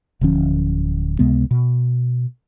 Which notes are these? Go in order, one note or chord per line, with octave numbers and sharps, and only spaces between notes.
D1 D3 F3 C#4
C#2 C3 G#3 B3
B2